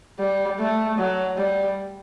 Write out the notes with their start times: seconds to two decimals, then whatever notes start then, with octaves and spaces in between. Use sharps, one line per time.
0.19 G3
0.59 A3
0.98 F#3
1.37 G3